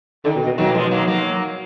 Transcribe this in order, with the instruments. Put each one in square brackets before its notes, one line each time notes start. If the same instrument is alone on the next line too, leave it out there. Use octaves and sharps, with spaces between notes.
[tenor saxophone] D3 [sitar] D#3
[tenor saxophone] B2
B2
[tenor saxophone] B2 [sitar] D#3 F#3
[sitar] A#3
F3 G#3
F#3 A#3
F#3 A#3